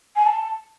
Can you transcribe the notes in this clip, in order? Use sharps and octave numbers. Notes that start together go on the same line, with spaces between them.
G#5
A5